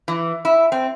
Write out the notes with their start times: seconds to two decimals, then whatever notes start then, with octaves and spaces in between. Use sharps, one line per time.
0.08 E3
0.45 E4
0.72 C4